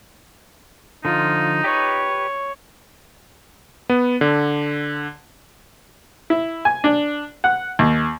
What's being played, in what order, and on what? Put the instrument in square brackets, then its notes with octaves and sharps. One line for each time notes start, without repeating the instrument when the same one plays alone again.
[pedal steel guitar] D3 F3 [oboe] D#4 [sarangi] F4
[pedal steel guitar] G4 B4 [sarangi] C#5
[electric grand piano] B3
D3
[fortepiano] E4
G#5
D4
F#5
D#2